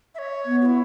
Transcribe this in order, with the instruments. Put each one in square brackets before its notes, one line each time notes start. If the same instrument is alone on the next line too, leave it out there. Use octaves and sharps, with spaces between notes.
[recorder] E5
C#5
[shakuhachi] B3
[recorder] F#4
E4